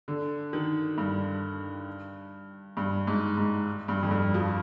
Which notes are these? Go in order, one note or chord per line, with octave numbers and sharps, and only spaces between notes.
D3
D#3
G2
G2
G#2
G#2
G2
F2
G2
F3